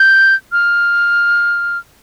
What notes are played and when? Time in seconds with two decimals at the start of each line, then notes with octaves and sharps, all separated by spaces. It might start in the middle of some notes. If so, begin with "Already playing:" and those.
Already playing: G6
0.52 F6